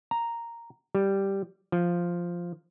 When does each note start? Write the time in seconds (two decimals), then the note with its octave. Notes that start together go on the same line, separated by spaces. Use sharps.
0.11 A#5
0.95 G3
1.72 F3